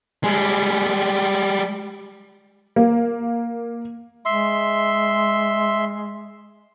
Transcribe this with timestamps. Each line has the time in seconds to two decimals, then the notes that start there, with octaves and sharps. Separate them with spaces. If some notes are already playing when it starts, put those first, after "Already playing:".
0.24 G3 G#3
2.76 A#3
4.25 G#3 E5 C6